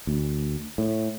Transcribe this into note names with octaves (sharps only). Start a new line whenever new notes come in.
D2
A2